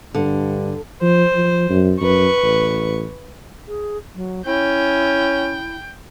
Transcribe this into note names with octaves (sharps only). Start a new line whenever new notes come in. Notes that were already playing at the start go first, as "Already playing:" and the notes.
G2 D3
F3 C5
F3
F#2
F#2 B4 C#6
A1
G#4
F#3
C#4 E4 G5